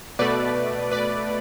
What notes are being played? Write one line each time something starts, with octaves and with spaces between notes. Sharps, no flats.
B2 A3 B4 D5
B4 D5